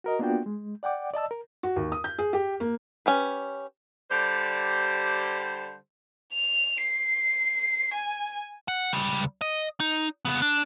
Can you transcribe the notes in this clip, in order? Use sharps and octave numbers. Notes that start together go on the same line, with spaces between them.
F#4 A#4 D#5
A#3 B3 D4 F4 F#4 G5
G#3
D5 F#5 G5 D6
D5 D#5 A5 E6
A#4
F#4
D#2
D#6
G6
G#4
G4
A#3
C#4 G4 B4
D3 G3 G4 C5
F7
C7
G#5
F#5
C#2 G3
D#5
D#4
C#3 B3
D4